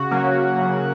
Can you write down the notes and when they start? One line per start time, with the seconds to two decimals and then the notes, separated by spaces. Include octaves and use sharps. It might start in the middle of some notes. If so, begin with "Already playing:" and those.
Already playing: C#3 F#4
0.11 F#3 A#3 C#4
0.59 C#3